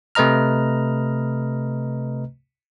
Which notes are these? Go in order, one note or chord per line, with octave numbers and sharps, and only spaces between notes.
C3 A3 B4 D#5 A#5 F6